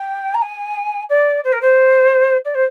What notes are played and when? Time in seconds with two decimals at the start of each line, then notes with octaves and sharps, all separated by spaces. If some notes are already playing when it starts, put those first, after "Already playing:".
Already playing: G5
0.35 A#5
0.42 G#5
1.10 D5
1.44 C5
1.53 A#4
1.61 C5
2.45 D5
2.55 C5